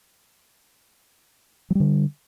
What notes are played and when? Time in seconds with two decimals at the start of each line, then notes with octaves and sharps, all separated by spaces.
1.70 F#3
1.75 G3
1.80 D3